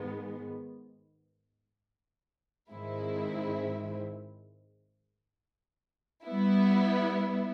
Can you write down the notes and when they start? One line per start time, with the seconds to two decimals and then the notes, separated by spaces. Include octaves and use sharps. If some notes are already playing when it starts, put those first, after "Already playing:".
Already playing: G#2 D#3 G#3 B3
2.71 G#2 D#3 G#3 C4 E4
6.25 G3 B3 E4